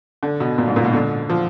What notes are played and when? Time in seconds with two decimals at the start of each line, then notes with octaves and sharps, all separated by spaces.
0.23 D3
0.40 B2
0.58 A#2
0.68 G#2
0.76 A#2
0.85 B2
0.93 D3
1.30 F3